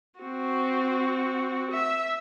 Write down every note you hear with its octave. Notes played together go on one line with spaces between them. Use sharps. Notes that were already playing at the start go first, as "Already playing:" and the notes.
C4 F#4
E5